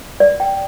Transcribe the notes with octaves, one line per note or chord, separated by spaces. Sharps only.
D5
G5